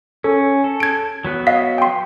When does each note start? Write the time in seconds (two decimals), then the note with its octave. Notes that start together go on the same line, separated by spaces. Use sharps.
0.24 C#4 A4
0.64 A4
0.80 G#6 D7
1.25 F#3 B3 F#6
1.47 D#5 F5 B6
1.78 G5 C6